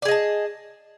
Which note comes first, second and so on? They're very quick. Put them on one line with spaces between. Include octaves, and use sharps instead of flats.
D5 G#4 D#5 A5